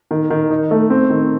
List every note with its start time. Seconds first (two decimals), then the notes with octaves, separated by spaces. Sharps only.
0.11 D#3
0.30 D#3
0.51 D#4
0.71 A3
0.90 C4
1.10 D#3